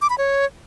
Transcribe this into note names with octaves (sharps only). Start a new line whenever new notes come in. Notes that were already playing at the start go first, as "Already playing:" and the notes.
D6
B5
C#5